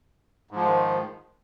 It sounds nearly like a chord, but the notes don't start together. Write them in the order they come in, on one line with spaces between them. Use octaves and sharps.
G#2 F3 G#3 D#3